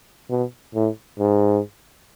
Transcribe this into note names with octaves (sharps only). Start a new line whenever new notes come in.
B2
A2
G#2